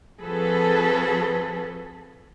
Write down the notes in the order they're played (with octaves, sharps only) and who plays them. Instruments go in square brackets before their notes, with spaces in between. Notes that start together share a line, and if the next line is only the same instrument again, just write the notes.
[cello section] F3 C4 F#4 G#4 A4 B4